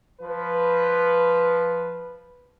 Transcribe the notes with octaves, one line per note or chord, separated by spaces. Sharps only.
F3 B4